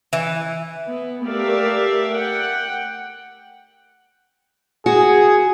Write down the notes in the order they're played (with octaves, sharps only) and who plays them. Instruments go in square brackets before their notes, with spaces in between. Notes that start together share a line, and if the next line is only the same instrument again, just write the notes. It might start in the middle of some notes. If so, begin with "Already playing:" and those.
[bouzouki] E3
[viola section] B3
A3 G4 A#4 D5 E5 F5
F#5 G5
[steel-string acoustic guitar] F#4 [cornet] G#4